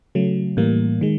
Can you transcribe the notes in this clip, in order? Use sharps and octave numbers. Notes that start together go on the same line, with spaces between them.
C#3 F#3 A3
A2 E3 G3 A#3
D#3 G#3